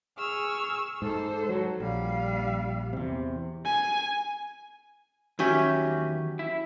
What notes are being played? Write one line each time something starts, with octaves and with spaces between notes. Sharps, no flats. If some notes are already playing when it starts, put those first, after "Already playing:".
G#4 C#6 E6 F6
G#2 A4 C5
F#3
A#1 G3 F5
E2 C3
G#5
E2 D#3 F#3 C#4 G4 E5
E4